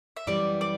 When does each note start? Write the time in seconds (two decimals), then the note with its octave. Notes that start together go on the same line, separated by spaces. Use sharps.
0.17 E5
0.27 F#2 E3 G3 B3 D5
0.61 D5